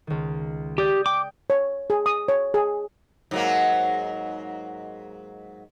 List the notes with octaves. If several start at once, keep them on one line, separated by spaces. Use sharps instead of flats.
C#2 D#3
G4 D5 D#6 G6
G5 D6
C#5
G#4
D#6
C#5
G#4
G#2 F#3 A#3